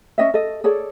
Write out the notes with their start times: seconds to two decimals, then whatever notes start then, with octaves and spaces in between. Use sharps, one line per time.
0.18 C#4 D#5 E5
0.34 A4 D#5
0.64 G#4 A4 C#5 D5